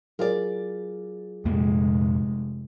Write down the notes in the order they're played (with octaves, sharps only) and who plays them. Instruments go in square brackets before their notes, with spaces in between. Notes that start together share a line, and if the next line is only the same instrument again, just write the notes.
[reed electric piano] F#3 F4 G#4 [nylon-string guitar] A#4 D5
[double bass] F1 G#3 [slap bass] F2 A#2 A#3